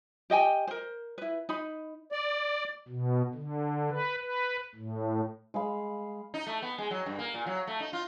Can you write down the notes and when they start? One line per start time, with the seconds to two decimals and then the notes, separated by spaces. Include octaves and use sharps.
0.30 G4 D#5 G5 G#5
0.67 A#4 C5
1.18 E4 B4
1.49 D#4 B5
2.12 D5
2.88 B2
3.34 D3
3.90 B4
4.21 B4
4.75 A2
5.54 G#3 F5 B5
6.34 D#4
6.47 A3
6.62 B3
6.78 G#3
6.91 F#3
7.06 G2
7.19 A#3
7.34 A#2
7.47 F#3
7.67 A3
7.80 D#4
7.93 F4